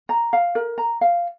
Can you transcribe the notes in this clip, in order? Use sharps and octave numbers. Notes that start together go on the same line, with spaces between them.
A#5
F5
A#4
A#5
F5